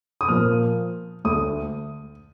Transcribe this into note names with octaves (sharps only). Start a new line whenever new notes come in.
D#6
A#2 F3 A#3 F6
D2 D3 A3 D#6